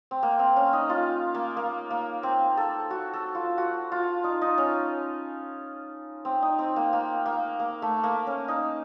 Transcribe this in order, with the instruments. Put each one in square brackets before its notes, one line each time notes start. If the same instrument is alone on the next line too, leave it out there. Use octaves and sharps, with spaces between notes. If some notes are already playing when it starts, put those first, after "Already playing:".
[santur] C4
A#3
C4
C#4
D#4
F4
A#3
A#3
A#3
C4
A4
F#4
A4
F4
F#4
F4
D#4
D#4
C#4
C4
D#4
C4
A#3
A#3
A#3
A#3
A3
A#3
C#4
D#4